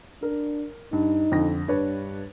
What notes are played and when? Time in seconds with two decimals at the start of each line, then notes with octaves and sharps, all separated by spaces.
0.22 D4 A#4
0.93 G2 D#4
1.32 F2 D3 A#6
1.68 G2 D4 B4 C#5